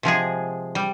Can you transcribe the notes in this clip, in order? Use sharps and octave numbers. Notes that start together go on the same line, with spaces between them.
C3 F3 G#3 G#4
G3